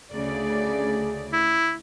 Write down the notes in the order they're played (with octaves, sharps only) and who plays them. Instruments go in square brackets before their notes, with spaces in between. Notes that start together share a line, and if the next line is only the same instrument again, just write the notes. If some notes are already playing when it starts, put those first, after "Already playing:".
[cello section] D2 C#3 D5 [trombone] G#4
[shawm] E4